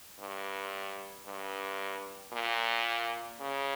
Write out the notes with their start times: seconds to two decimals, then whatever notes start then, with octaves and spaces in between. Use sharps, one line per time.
0.19 G2
1.26 G2
2.33 A#2
3.40 C#3